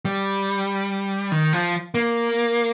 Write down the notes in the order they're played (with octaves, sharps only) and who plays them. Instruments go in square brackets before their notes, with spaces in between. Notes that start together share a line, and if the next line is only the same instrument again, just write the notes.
[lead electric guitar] G3
D#3
F3
A#3